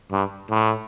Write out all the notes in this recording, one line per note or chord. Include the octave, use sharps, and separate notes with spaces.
G2
A2